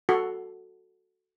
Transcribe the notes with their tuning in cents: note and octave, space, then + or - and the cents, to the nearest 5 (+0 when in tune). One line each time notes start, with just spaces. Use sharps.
F#4 +0 A4 +0